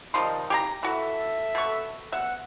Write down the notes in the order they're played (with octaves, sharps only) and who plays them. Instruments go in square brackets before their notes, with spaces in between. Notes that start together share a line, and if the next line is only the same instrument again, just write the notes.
[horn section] C3 D#3 D#4 [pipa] F3 G3 C6
[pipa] G4 G#4 A#5
[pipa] E3 F#4 [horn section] A4 E5
[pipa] B2 C#6
[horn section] B2 F#5 [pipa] E5